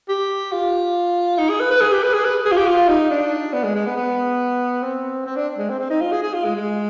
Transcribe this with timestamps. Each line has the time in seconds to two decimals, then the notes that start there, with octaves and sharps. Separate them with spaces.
0.09 G4
0.52 F4
1.38 D#4
1.49 G#4
1.60 B4
1.71 B4
1.81 G#4
1.92 G4
2.03 B4
2.13 G#4
2.25 B4
2.45 G#4
2.52 F4
2.57 G4
2.67 F4
2.88 D#4
3.10 D4
3.53 B3
3.64 G#3
3.75 G#3
3.86 B3
3.97 B3
4.83 C4
5.26 C4
5.36 D4
5.58 G#3
5.69 C4
5.79 C4
5.90 D#4
6.01 F4
6.12 G#4
6.23 G#4
6.33 F4
6.45 G#3
6.56 G#3